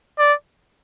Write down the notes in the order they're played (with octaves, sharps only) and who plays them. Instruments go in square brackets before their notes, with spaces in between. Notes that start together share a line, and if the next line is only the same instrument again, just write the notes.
[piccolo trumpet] D5